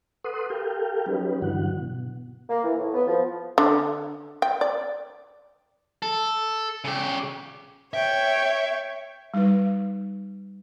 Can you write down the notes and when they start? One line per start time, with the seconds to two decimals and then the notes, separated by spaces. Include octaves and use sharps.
0.24 A4 B4 F#5 C6 D#6
0.50 G4 A4 A#4 F5 G5
1.06 F#3 C#4 D#4 G4 B4
1.42 G2 D3 E3 F#3 F#5
1.80 B2
2.49 A#3
2.63 E3
2.77 A2
2.93 B3
3.07 F3
3.58 D3
4.42 G5
4.61 D5
6.02 A4
6.84 C#3 G4
7.94 C#5 E5 G5
9.34 G3 D#4 B4